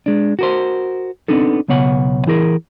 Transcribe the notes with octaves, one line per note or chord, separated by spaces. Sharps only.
G#3 D4
F#4 A#4 C5
B3 C4 D4 D#4 A4
B1 C#3 B3 C#5 F#5
E3 E4 G#4 A#4